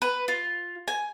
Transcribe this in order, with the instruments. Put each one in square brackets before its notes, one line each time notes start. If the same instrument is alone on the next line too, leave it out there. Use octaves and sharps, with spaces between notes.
[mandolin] B4
F4
G#5